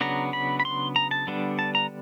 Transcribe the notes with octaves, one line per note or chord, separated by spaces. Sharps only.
C#3 F#3 B3 D4 A#5
B5
B5
C6
A#5
A5
D3 G3 B3 D4
A5
A#5